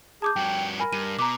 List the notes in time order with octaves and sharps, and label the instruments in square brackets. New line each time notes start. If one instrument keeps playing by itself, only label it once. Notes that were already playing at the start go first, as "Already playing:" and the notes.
[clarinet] G#4 [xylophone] A5 D6 G6
[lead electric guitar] G2 F#4 [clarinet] G5
[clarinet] A#4 [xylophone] G#5 B5
[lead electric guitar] G2 [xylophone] D#7
[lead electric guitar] B2 [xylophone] A#5 D6